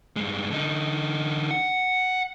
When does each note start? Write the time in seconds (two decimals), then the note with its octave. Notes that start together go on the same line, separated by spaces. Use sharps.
0.16 G2 G#3
0.50 D3 D#4
1.51 F#5